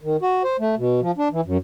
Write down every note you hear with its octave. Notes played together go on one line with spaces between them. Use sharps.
D#3
F#4
C5
A3
B2
F3
D4
E3
F#2